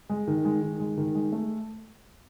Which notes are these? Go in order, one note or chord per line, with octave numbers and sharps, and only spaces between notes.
G#3
D#3
G#3
D#3
G#3
D#3
G#3
A3